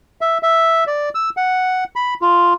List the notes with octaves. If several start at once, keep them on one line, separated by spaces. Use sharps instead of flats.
E5
E5
D5
E6
F#5
B5
F4